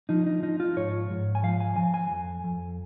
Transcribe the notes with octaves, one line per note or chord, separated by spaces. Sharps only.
F3 D#4
D#4
F3 D#4
F4
G#2 C#5
G#2
G#5
F3 F5
G#5
F3 G#5
G#5
F2
F2